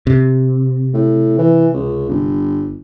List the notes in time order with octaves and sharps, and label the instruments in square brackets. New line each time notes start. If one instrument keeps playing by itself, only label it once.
[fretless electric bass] C3
[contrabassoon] A2
E3
C#2
G1